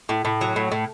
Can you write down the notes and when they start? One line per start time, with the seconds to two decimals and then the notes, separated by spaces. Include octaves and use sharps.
0.09 A2
0.25 A2
0.41 F#3
0.56 A2
0.72 A2